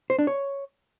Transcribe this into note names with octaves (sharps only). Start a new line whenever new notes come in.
C5
D4
C#5